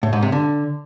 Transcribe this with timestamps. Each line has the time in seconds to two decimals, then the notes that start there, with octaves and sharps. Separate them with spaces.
0.03 A2
0.13 G#2
0.22 C3
0.32 D3